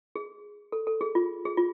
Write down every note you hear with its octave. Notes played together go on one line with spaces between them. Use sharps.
G#4
A4
A4
G#4
F4
G#4
F4